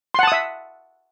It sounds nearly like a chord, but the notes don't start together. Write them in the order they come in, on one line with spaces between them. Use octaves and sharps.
C6 F#5 A5 D#6 E5